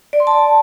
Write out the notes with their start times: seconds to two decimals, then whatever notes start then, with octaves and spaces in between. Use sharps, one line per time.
0.13 D5
0.20 C6
0.27 A5